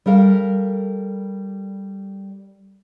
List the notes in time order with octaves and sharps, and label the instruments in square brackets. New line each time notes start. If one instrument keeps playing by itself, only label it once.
[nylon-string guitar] G3 A4 A#4 F5